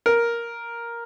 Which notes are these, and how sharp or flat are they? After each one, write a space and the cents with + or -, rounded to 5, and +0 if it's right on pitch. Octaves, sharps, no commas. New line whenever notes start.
A#4 +5